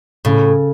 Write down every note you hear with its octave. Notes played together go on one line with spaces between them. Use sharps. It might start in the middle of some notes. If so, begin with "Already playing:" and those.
A2 C#3